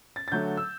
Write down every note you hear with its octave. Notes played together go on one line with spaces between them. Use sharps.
A6
A6
D3 F#3 A3 G6
E6